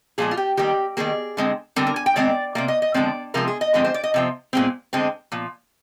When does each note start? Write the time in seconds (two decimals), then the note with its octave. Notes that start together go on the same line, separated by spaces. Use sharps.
0.18 A#2 F3 G#3 G#4
0.31 F4
0.37 G4
0.57 D#3 G3 A#3 G4
0.97 D#3 G3 A#3 G#4
1.37 D3 G#3 C4
1.76 D3 G3 C4 A#4
1.87 A#4
1.96 G#5
2.06 G5
2.16 D#3 G#3 C4 D5
2.55 C3 F3 A#3 D5
2.68 D#5
2.82 D#5
2.94 D3 F3 G#3 C4 D5
3.34 C3 F3 G#3 C4 A#4
3.48 G#4
3.61 D#5
3.74 D3 F3 G#3 C4 D#5
3.84 C5
3.94 D5
4.04 D#5
4.14 C3 F3 C4
4.53 A#2 G#3 C4
4.93 D3 G#3 C4
5.32 A#2 F3